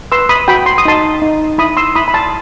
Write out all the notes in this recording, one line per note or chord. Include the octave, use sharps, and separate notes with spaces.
B4 C6 E6
B5 D#6
F#4 G5 B5
C6
D#6
D#4 A5 C6
D#4
E4 B5 D#6
C6 E6
E4 B5 D#6
B5
A5 C6